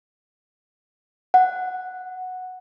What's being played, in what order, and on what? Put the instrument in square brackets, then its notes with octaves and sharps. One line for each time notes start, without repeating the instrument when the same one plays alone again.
[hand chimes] F#5